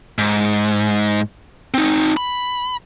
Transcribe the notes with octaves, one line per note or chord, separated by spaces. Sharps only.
G#2
C4 D#4
B5